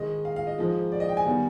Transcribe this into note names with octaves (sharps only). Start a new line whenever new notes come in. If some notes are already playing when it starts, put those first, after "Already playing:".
Already playing: G#2 D#3 G#3 D#5
F5
F5
D#5
G#2 F3 G#3
D5
D#5
G5
G#5
D#3 G3 B3